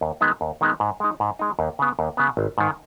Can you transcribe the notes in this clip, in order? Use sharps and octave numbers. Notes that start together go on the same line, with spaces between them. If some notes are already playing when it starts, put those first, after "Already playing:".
D#2
D#3 G#3 B3 D#4
D#2
D#3 G#3 B3 D#4
G#2
G#3 D#4
G#2
G#3 D#4
D#2
C#3 B3
D#2
C#3 B3
G#1
G#2 D#3